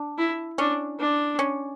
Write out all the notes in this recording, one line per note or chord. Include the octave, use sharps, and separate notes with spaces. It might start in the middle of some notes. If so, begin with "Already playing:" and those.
Already playing: D4
E4
C#4 D4
D4
C#4